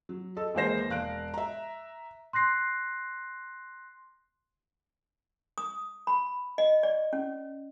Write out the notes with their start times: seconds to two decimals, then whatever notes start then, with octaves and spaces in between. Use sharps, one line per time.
0.09 F#3
0.36 A4 D#5
0.54 D#2 E3 G#3 A#4 C5 A#6
0.89 E1 F5 F#6 D7
1.34 E5 A#5
2.33 C6 F#6 A#6 C7
5.58 D#6
6.07 B5
6.58 D#5
6.83 D5
7.13 C#4